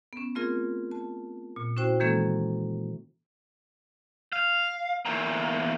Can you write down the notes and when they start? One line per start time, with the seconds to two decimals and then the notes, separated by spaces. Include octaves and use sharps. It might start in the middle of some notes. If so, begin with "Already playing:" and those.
0.13 B3 C#4
0.35 A3 C4 F4 G#4 A#4
0.91 A5
1.56 A#2
1.77 C#4 E4 F#4 C5 G5
2.00 D#3 E3 G#3 A#3 C#4 A4
4.33 F5
5.06 E2 A#3